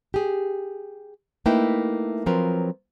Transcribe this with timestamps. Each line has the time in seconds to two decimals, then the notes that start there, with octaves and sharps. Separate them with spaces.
0.14 G4 G#4
1.46 A3 A#3 D#4 E4 B4 G5
2.26 F3 F#3 C4 F4 A#4 B4